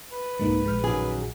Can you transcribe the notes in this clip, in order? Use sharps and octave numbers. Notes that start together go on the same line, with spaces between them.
B4
C2 G#2 G#3 A#3 D#4
A#1 G#3 F6
F#2 D#3 G#4